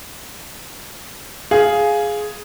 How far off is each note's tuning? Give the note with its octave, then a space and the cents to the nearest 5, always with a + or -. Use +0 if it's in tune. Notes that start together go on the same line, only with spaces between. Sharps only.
G#4 +5 F5 +0